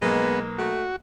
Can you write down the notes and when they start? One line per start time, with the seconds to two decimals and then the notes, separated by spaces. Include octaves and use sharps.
0.02 B1 G#3 A#3 B3
0.58 A3 F#4